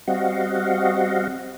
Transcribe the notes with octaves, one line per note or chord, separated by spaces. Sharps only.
G3 C4 F#4 D#5 F5 F#5